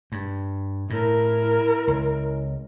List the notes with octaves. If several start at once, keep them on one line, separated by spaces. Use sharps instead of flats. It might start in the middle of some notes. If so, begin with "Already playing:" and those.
G2
A2 E4 A#4
C#2